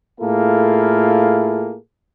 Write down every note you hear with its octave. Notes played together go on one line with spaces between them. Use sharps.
A2 A#3 E4 F4 G#4 A4